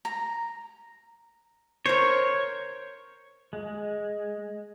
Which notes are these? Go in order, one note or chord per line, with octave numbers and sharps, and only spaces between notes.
A#5
A#4 C5 C#5
G#3